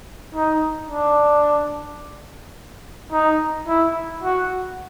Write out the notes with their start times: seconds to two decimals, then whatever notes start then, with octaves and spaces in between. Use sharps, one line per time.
0.35 D#4
0.90 D4
3.12 D#4
3.68 E4
4.23 F#4